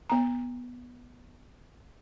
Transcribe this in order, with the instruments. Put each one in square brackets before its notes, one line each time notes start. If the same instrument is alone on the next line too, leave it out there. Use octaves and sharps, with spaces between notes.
[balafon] B3 A#5